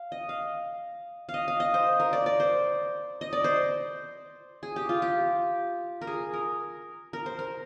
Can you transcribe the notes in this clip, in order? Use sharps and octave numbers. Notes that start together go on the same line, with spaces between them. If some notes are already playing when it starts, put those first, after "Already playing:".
Already playing: F5
D#5
F5
F5
D#5
F5
D#5
C5
A#4
D5
D5
C5
D#5
D5
C5
G#4
G4
F4
G4
A#4
G#4
A#4
A#4
C5
A#4